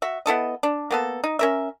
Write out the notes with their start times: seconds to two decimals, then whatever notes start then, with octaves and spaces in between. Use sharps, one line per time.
0.02 F#4 E5
0.26 B3 E4 A4 D#5
0.63 D4
0.91 A#3 B3 A4
1.24 D#4
1.39 C#4 A#4 E5